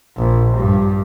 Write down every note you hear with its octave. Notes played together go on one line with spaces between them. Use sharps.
A#1
G2